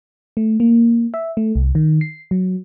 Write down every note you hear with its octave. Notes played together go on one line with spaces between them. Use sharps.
A3
A#3
E5
A3
C2
D#3
C7
F#3